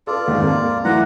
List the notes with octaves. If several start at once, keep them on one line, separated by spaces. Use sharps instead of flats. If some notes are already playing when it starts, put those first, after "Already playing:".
F4 A4 B4 D5
D#2 G#2
F2 A#3
E3 F#3 A3 F#5 A#5